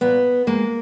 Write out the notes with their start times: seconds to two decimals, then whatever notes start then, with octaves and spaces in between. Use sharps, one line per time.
0.01 A#2 B3
0.47 G#3 A#3